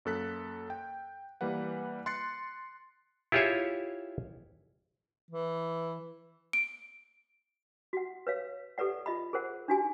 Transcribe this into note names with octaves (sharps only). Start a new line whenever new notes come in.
F#2 A#3 A4 F#6 B6
G5
E3 G3 A#3 B4 F#5
C6 F#6 A6 C7 C#7
E4 F4 G4 G#4 C#5 E5
E3
D7
F#4 F#5
B4 C#5 F5
G4 A4 B4 D5 F#5
F4 D#5 B5
G#4 A#4 C5 F#5
D4 D#4 F#4 G4 G#5